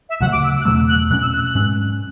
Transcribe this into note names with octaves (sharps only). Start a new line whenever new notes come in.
E5
D2 C#3 F#3 F#5
D6
E6
E6
F#6
E2 B2 F#3 A3 E6
F#6
B2 F#3 C#4 F#6
E6
F#6
F#6
G#2 G#3 C#4